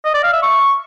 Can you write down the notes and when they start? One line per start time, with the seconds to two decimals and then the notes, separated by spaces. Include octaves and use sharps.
0.05 D#5
0.14 D5
0.23 F5
0.33 E5
0.42 C#6